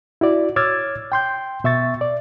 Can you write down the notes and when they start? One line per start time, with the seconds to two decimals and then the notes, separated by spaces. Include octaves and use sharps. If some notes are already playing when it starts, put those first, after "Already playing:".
0.21 E4 F#4 D5
0.56 C#5 D6 E6 F6 G#6 A6
1.12 G5 C6 G6
1.64 B2 E5 C#6 A6
2.01 D5